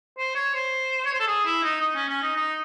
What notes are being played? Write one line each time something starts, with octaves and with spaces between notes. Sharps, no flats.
C5
C#5
C5
C#5
C5
A4
G#4
E4
D#4
D#4
C#4
C#4
D#4
D#4